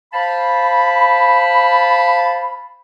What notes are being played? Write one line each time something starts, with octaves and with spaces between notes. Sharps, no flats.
C5 F5 A5 B5